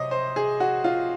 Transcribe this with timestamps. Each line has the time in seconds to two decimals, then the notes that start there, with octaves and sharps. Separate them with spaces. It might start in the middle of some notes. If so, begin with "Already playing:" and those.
Already playing: C3 F#3 C4 D#5
0.11 C5
0.36 G#4
0.60 F#4
0.84 F4